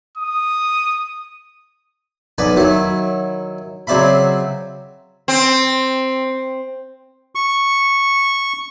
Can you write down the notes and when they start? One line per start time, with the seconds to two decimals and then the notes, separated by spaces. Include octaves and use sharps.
0.18 D#6
2.38 B1 B4 D5 G#5
2.56 D#3 F#3 E4
3.87 C#3 F#3 C4 D5 E5 B5
5.28 C4
7.35 C#6